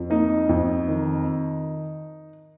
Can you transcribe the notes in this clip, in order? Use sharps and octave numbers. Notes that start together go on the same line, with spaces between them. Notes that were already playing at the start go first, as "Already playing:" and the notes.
Already playing: F2
A#3 D#4
F2
D#3